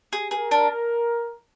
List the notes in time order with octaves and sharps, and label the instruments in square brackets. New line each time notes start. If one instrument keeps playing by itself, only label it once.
[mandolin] G#4
[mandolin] G#4 [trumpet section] A#4
[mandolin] D4